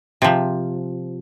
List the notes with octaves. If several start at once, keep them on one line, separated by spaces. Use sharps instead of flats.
C3 F3